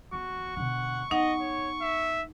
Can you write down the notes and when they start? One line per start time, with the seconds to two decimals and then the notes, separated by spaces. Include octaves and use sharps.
0.13 E2 F#4 C#6
0.56 B2 D3 F#5
1.11 B3 D#4 D#5 F#5
1.41 C#5
1.82 E5